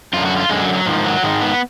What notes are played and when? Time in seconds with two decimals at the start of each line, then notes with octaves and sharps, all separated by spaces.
0.13 F#2 D3 F4
0.26 F#4
0.37 F4
0.49 F#2 D3 G#3
0.61 F#3
0.74 F#3
0.86 G#2 D#3 F3
1.04 F#3
1.23 G#2 D#3 G#3
1.41 B3